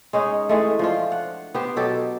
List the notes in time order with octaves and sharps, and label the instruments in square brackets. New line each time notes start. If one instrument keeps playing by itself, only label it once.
[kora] G#3 C#4 D#4
E3 G#3 A3
F3 D4 F4
F#5
B3 G4 C5
B2 F#3 G4 A4